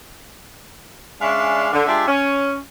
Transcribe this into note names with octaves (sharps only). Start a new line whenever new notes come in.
G#3 C#4 D4 D5 E5 F5
D3
G#3 D4 F4 G4 E5
C#4